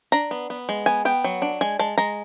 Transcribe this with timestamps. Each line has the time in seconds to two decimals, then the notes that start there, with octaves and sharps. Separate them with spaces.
0.12 D4 A#5
0.31 B3
0.50 B3
0.69 G#3
0.86 B3 G#5
1.05 B3 G5
1.24 F#3
1.42 D4
1.61 G#3 G#5
1.79 G#3 A5
1.98 G#3 A#5